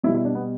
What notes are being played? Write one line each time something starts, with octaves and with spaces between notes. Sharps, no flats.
B2 G3 E4
E4
D4
B3